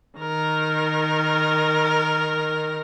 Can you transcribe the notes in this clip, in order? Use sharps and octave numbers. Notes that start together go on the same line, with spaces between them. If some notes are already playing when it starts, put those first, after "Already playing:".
D#3 A#4